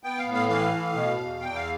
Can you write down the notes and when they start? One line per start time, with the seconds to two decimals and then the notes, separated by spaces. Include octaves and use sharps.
0.04 B3 G5
0.18 F5
0.27 A2
0.34 F5
0.49 E3 F5
0.72 A2
0.95 B2
1.18 E2
1.40 E2 G5
1.55 F5